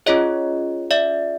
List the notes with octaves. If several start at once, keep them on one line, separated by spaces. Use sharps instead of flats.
C#4 F4 G#4 C#5 D#5
D5 E5